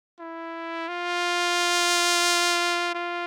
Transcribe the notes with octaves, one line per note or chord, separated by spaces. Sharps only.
E4
F4
F4